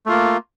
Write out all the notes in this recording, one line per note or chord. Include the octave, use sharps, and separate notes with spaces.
A3 A#3 F4